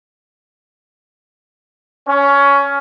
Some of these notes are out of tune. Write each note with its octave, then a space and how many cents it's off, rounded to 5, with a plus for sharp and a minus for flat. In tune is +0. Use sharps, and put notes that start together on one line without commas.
C#4 +15